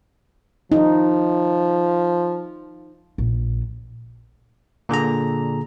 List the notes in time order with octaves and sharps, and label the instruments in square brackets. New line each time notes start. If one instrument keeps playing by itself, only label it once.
[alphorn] F3 [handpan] D#4
[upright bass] A#1
[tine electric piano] A#2 D3 G#4 A#5